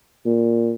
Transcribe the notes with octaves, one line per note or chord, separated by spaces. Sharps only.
A#2